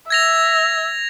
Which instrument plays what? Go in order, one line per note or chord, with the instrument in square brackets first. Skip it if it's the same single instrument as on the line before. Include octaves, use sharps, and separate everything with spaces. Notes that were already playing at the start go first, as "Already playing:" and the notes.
[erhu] E5 [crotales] G#6 A#6 F7